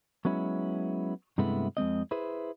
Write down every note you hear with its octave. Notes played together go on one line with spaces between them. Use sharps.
F#3 G#3 B3 C#4 E4
G2 C3 G#3 A3 B3 E4
F2 G#3 C4 D#5
E4 G#4 B4 C5